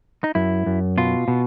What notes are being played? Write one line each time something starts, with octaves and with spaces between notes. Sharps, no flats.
D#4
F#2 E4
F#2
B2 F4
B2